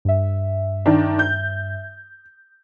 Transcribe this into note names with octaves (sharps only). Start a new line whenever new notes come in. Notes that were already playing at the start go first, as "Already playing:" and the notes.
G2 E5
D#3 D4
G6